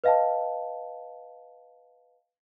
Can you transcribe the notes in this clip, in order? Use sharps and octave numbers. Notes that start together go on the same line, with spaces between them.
B4 D#5 F5 G5 A5